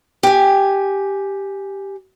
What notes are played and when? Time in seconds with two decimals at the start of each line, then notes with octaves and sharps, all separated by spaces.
0.23 G4 G#5